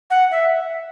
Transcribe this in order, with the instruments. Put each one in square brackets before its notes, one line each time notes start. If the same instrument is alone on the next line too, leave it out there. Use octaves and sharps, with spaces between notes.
[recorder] F#5
E5